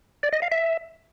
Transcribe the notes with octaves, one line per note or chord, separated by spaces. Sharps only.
D5
D#5
F5
E5